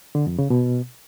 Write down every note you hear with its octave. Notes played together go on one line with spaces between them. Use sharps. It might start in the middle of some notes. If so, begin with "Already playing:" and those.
D3
F2
C#3
B2